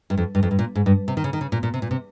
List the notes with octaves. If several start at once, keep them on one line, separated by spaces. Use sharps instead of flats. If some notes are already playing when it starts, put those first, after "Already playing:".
G2
F2
G2
F2
G2
A#2
G#2
G2
C3
D#3
C#3
D#3
C#3
A#2
A#2
C3
A#2
C3